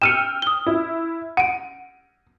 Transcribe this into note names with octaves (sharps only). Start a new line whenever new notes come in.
G5 E6 F6 C#7 D#7 E7
D#6 G7
E4
F#5 D7 D#7